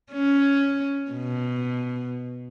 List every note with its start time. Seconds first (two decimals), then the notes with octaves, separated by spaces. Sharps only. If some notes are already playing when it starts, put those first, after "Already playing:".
0.12 C#4
1.11 B2